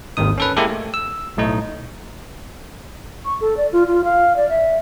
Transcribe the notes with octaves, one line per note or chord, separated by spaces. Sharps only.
G#1 D#2 D#3 D#6
C#4 A4 B4
G#3 A#3 E4 G4 A4
A3
E6
B1 A2 A3 D#4
C#6
A4
D5
F4
F4
F5
D5
E5